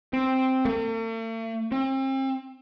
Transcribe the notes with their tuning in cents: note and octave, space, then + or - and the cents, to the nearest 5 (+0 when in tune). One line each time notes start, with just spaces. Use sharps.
C4 +0
A3 +45
C4 +35